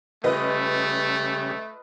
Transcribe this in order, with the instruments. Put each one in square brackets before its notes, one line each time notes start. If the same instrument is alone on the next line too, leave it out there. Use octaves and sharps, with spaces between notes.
[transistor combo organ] C#3 G3 [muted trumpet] A3 [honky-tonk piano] F4 B4 D#5